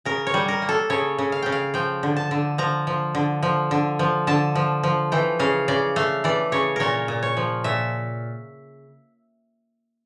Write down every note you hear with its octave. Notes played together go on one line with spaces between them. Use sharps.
C#3 A#4
C#5
G3
A#4
A#3
A4
C#3 C#5
C#3
F5
C#3 G5
F5
F3 G5
D3
A5
D3
F3 A#5
F3
D3
F3
D3
F3
D3 A5
F3
F3
E3 G5
C#3 F5
C#3 D5
A3 F5
E3 D5
C#3 C#5
A#2 A#4 C#5
A#2
C#5
F3
A#2 E5